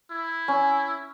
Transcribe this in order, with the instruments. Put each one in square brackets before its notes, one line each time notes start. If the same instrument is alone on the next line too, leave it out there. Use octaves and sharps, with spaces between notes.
[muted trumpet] E4
[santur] C#4